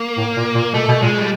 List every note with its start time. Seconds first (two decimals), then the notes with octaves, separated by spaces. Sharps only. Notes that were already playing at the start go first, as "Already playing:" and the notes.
Already playing: A#3
0.17 A2
0.37 A#2
0.55 A#2
0.73 B2 A3
0.88 B2
1.02 A#2 G#3
1.19 G3